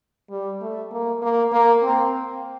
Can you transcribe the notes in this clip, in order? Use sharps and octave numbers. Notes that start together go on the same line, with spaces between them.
G3
A3
A#3
A#3
A#3
C4